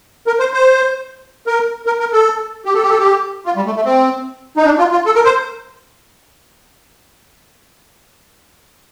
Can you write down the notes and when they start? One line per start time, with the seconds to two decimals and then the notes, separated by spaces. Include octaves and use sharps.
0.27 A#4
0.39 C5
0.53 C5
1.47 A#4
1.86 A#4
2.00 A#4
2.12 A4
2.65 G4
2.75 A4
2.82 G4
2.90 A4
2.99 G4
3.46 F4
3.56 G3
3.66 A3
3.76 A3
3.85 C4
4.57 D#4
4.65 D4
4.78 F4
4.92 F4
5.06 A4
5.15 A#4
5.25 C5